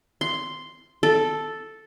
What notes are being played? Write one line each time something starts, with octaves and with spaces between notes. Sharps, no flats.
C6
A4